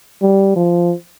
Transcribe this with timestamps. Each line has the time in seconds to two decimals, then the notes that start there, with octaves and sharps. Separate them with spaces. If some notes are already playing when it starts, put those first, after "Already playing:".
0.22 G3
0.56 F3